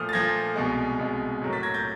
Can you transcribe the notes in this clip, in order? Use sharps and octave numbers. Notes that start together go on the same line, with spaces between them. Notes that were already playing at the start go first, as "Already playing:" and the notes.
Already playing: A#2 F3 A3 D#6 F6
A6
A#2 F3 A3 G#6 A#6
C2 B2 G#3
C2 B2 G#3
A2 F#3 A#3
A6 B6
G#6 A#6
G6 A6